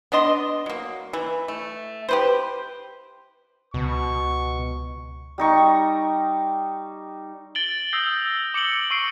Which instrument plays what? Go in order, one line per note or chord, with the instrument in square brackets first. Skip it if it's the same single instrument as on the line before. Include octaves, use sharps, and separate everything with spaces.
[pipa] B3 D4 D#5 C6
F#3 A#3
E3
A3
G4 B4 C5
[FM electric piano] C#2 [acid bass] B2 [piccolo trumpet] C#6
[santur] G3 D#4 C#6
[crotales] A6 D7 F#7 G7
D#6 E6 G6 A#6 C7
D6 C#7 D7 F#7 G7
C#6 E6 C7 D7